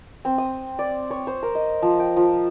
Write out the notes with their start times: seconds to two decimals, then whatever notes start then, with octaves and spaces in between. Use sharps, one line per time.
0.25 C4
0.38 D#6
0.79 D5
1.11 C#5
1.27 C5
1.43 A#4
1.55 D#5
1.82 F3
1.99 G5
2.17 F3